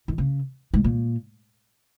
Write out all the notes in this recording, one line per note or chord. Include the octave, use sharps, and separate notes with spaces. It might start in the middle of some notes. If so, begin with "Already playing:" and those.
D#3
C#3
G#2
A#2